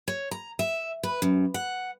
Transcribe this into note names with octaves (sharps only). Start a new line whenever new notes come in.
C#5
A#5
E5
B4
F#2
F#5